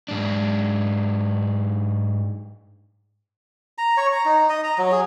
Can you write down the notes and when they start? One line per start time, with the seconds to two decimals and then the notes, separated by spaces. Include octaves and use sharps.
0.08 G#2 D4
3.78 A#5
3.97 C#5
4.13 A#5
4.25 D#4
4.49 D#5
4.64 A#5
4.78 F#3
4.92 G#4